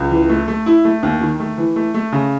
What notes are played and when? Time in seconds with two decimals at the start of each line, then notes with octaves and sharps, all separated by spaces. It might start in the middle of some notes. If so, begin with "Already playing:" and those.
Already playing: C#2
0.11 E3
0.29 A3
0.48 A3
0.66 E4
0.85 A3
1.03 D#2
1.21 D#3
1.40 A3
1.58 E3
1.76 A3
1.94 A3
2.12 C#3